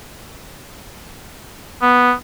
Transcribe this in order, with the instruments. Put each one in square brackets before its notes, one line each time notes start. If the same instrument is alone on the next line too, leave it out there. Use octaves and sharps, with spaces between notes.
[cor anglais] B3